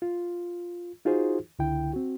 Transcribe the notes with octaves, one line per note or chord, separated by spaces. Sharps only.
F4
D#4 F4 F#4 G#4 C5
C#2 D3 E4 G5
C4 F#4